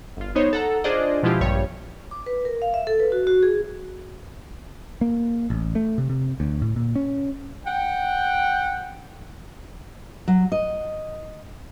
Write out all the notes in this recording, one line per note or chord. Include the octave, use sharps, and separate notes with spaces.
G1 F4
B3 D#4 C5 C#5 D#5
A4 F#5 A#5
D4 F4 G#4 C5 D5 D#5
B2 F3 G#3 E4 F4 G4
A#1 G2 G3 G4 C#5
D6
B4
A#4
F5
E5
A4
B4
F#4
F#4
G#4
A#3
A1
A3
C3
C3
D2
A2
A#2
C#4
F#5 G5
F#3
D#5